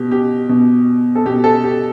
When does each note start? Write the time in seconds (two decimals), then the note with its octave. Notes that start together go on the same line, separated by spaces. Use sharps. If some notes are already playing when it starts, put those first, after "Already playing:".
Already playing: B2 G4
0.11 G4
0.49 B2
1.15 A4
1.25 B2 G4
1.44 A4
1.64 G4